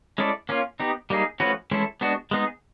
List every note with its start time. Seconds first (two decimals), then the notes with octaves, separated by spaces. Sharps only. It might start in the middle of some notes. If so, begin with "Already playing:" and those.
0.18 G#3 C#4 E4 A4 D5
0.49 A#3 C#4 F4
0.80 B3 D#4 G4
1.10 G3 A#3 D#4 G#4
1.40 F3 A3 C#4 F#4 B4
1.71 E3 G#3 C#4 E4 A4
2.01 G#3 B3 D4 F#4
2.31 G#3 B3 D#4 G#4